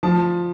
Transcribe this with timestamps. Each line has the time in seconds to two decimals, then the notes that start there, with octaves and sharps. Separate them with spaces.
0.03 F3 A5